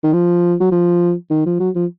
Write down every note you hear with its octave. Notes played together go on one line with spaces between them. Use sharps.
D#3
F3
F#3
F3
D#3
F3
F#3
F3